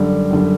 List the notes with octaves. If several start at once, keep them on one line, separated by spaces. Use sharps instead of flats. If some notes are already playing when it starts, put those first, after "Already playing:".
Already playing: F#2 D3 G3
F#2 D3 G3